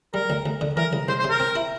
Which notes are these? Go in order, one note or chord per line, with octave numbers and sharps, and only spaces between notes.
G3 A#4
D2
D2
D3
E3 A#4
C2
C2 C5
C5
C3
A#4
C4
E4